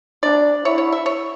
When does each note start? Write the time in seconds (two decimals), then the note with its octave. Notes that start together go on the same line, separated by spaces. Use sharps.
0.23 D4 D5
0.65 E4 C#5
0.78 C#5
0.92 E5
1.06 C#5